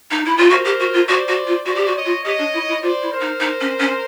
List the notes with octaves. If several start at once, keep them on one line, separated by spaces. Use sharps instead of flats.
D#4
E4
F4
F#4 A#4 C5
G4
F#4
F4
F#4 C5 D5
F#4
F4
F#4 C5 D5
G4
F#4
C#5 D#5
F4
G4 C#5 D#5
D4
E4
E4
F4 C5 D5
E4
A#4 C5
D#4
D#4
C#4
C#4